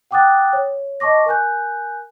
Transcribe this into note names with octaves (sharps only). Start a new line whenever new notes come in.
F#5 G5 D6 D#6 F#6 A6
C#5
D#5 A5 C#6 D6 A#6
A#4 G#5 F#6 G6